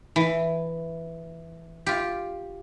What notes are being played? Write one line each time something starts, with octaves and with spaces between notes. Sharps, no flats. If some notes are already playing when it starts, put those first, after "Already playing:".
E3
F4 G4